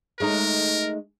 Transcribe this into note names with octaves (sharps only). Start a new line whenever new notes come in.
G#3 A3 D#4 A#4